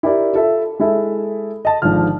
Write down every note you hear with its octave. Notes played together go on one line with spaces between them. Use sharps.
E4 G4 A#4 D5
F4 A4 E5
G#3 E4 A4 E5
D#5 A5
G#1 G#2 D3 F3 F6